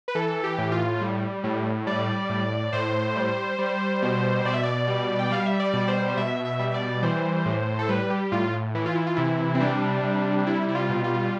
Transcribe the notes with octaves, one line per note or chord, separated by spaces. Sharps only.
B4
E3 A4
G4
A2
F4
G3
A2
G3 D5
A2
A2 C5
G3
G3
B2
B2 D5
E5
D5
G3
G5
G3 F5
E5
D5
B2
C5
B2 E5
E5
G3
D5
E3 C5
A2
A4
G3 B4
G4
A2 F4
E3 E4
F4
E4
F4
C3 E4
C4
G3 D4
C3
G3 E4
E4
F4
B2
F4